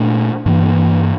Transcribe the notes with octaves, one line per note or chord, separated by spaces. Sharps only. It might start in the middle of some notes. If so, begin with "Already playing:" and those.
Already playing: A#2 A3 D4
G2 E3 A#3